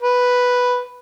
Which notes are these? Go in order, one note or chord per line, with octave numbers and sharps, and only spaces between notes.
B4